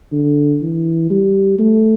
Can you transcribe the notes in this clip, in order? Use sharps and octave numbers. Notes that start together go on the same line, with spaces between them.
D3
E3
G3
A3